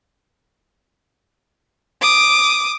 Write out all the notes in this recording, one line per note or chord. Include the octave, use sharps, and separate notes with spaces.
D6 D#6